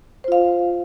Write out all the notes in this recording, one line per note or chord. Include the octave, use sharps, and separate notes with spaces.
F4 C5 F5